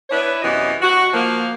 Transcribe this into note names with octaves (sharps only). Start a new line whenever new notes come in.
B3 D4 E4 B4 C#5
F#2 C3 E3 B3 D#5
F#4
F3 A#3